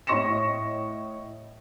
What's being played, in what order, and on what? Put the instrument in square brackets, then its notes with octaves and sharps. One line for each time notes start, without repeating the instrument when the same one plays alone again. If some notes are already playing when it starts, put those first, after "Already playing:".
[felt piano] A2 D#5 C#6 A#6 C#7 E7